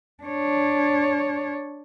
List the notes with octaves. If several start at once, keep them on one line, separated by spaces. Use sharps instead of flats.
D4 C#5